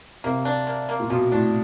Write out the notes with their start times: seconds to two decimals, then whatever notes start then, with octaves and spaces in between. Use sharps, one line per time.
0.24 C3 A#3
0.45 D4
0.67 A#3
0.89 A#3
1.00 A#2
1.10 B2 F3
1.31 A2 D4